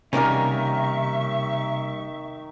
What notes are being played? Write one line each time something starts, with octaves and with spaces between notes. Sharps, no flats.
C3 D#3 G3 A#3 C#4 A#4 E5 C#6